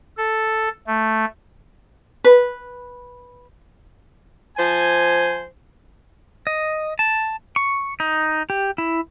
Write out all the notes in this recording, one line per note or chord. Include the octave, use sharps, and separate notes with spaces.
A4
A3
B4
F3 C5 G#5
D#5
A5
C#6
D#4
G4
E4